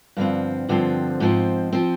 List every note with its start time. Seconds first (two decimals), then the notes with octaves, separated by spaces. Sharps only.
0.17 G2 D3 F3 C4
0.69 G2 D3 F3 C4
1.20 G#2 F3 C4
1.73 F3 C4